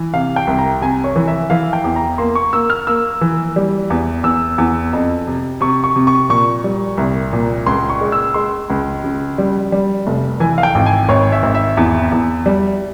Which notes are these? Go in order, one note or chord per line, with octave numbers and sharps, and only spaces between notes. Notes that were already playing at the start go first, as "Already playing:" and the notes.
Already playing: E3
C3 F5
G5
C2
A#5
C3 G#5
C#5
E3
E5
E3 F5
G5
E2
A#5
A#3 C6
C#6
A#3 E6
F6
A#3 E6
E3
G3
E2
E2 E6
E2
F2
C3
C3 C#6
C#6
C3
C#6
A#2 C#6
G3
C2
A#2
C#2 C6
C#6
G#3
E6
G#3 C6
C#2
C#3
G3
G3
F1
E3 G#5
F5
G5
G#1
G#5
G#1 C#5
E5
G#1
E5
E2
E2
G3